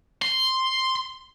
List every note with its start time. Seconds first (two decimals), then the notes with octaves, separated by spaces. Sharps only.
0.22 C6